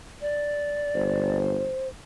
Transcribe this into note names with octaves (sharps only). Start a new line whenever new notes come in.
D5
G1 C5